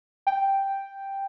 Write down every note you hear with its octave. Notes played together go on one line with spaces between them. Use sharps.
G5